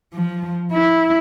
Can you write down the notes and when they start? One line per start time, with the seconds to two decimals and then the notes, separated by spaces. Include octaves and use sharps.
0.14 F3
0.73 E4